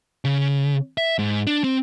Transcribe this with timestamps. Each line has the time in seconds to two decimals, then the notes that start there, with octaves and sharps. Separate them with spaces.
0.25 C#3
0.98 E5
1.19 G#2
1.47 D4
1.64 C4